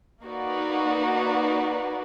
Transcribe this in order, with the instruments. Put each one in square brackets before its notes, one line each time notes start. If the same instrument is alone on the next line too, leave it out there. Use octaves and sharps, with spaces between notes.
[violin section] A#3 D#4 F#4 B4 D5